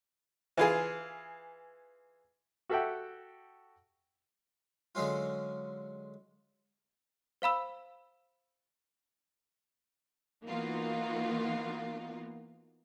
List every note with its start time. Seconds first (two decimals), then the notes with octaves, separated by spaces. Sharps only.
0.57 E3 F4 G#4
2.70 F#4 G4 A4 E5 F#5 G5
4.95 D3 F#3 G#3 C#4 F4
7.42 C5 F5 B5 E6
10.45 E3 A#3 B3 D#4 F4 F#4